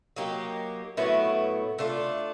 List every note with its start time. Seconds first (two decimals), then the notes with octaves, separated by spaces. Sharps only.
0.16 F#3 A#3 D#4 G4
0.97 A2 F#3 B3 E4
1.79 A3 D4 F4